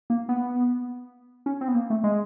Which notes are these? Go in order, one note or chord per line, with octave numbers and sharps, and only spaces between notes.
A#3
B3
C#4
C4
B3
A#3
A3
G#3